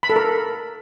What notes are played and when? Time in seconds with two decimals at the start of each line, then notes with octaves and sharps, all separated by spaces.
0.03 B5
0.10 A4
0.16 A#4